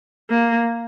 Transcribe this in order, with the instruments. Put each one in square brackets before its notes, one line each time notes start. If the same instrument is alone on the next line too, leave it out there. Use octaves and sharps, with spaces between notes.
[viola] A#3